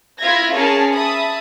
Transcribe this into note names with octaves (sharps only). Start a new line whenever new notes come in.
E4 F4 E5 G#6 A#6
C#4 G#4 A#4 C#5 A5 A#5
E5 A5 B5 D#6